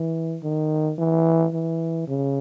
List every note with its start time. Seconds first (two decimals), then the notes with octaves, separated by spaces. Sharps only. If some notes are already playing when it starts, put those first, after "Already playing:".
Already playing: E3
0.43 D#3
0.98 E3
1.53 E3
2.08 C#3